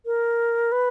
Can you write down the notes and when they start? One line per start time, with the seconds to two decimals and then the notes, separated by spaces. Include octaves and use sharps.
0.06 A#4
0.72 B4